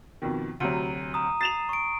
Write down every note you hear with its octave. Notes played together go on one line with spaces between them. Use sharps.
F2 B2 D#3
D2 C3 F#3 D#7
A#5 D#6
A6 C7 E7 F7
C#6 D7